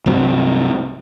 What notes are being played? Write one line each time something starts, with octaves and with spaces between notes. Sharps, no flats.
C2 G2 C3 F#3